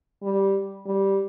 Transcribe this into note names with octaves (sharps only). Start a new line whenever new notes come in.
G3
G3